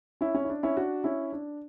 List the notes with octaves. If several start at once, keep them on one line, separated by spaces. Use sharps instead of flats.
C#4 E4
C#4
E4
D4
C#4 E4
D4 F#4
C#4 E4
D4